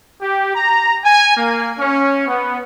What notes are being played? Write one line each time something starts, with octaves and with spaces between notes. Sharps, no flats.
G4
A#5
G#5
A#3
C#4
B3